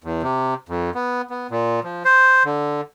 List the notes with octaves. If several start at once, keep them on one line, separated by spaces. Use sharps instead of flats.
E2
C3
F2
B3
B3
A#2
F3
C5
D3